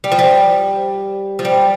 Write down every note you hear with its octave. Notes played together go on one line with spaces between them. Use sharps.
G3
F3
G3
F3
G3